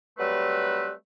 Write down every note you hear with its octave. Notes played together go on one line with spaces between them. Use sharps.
F#3 G3 A3 C4 B4